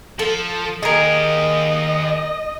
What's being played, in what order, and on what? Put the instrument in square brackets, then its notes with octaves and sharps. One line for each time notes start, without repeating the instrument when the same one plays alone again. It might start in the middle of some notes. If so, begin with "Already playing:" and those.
[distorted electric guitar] F3 [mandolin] A4
[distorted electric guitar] D#2 G4 [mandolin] G#4 A#4 [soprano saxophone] D#5